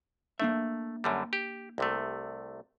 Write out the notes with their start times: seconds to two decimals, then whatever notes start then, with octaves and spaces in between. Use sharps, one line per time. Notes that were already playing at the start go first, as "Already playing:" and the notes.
0.40 A3 A#3 D4 E5
1.04 F#2 D3 G3
1.33 G4
1.78 C2 C3 A3